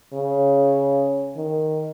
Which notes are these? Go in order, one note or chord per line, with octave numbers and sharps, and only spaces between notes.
C#3
D#3